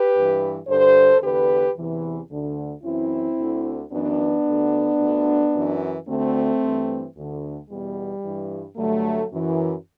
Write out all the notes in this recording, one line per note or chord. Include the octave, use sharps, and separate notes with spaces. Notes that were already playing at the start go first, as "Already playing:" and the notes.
Already playing: G4 B4
G2 E3
G2 D3 A4 C5
E2 D3 G4 B4
E2 C3 E3
D2 D3
F#2 E3 C4 E4
D2 D3
F#2 E3 B3 D4
D2 D3
D2 D3
F#2 E3
D2 D3 A3 C4
G2 E3
D2 D3
E2 B2 G3
G2 E3
G2 D3 F#3 A3
F#2 E3